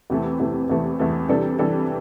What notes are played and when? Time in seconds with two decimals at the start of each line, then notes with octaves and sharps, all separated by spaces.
0.10 E2 C3 E3 A3
0.40 E2 C3 E3 A3
0.69 E2 C3 E3 A3
0.99 E2 C3 E3 A3
1.29 C3 E3 G3 D4 A4
1.59 C3 E3 G3 D4 A4